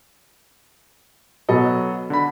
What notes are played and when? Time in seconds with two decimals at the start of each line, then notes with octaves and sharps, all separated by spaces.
1.49 B2 F#3 A4 D#5
2.10 D3 B5